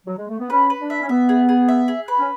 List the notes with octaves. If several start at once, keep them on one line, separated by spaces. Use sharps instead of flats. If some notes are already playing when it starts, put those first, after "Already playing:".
F#3
G#3
A3
B3
C#4 B4
B4
D4
E5
C#4
B3 E5
G#4
G#4
E5
G#4
B4
C#4